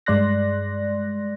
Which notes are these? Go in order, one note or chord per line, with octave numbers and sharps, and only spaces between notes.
G2 G#3 D5 C6 F#6 A#6